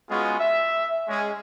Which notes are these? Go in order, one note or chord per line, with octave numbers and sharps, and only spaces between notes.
G#3 B3 C#4 F4 F#4 G#4
E5
G#3 C#4 G#4